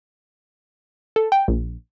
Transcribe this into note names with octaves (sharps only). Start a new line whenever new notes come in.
A4
G5
A#1